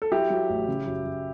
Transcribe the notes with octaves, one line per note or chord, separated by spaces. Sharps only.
A4
F#3 E4 G4
F#3
A1
C#3
F#2
F#2